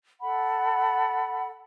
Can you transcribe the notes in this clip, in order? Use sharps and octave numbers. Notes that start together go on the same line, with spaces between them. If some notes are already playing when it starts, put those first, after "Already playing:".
A4 F#5 B5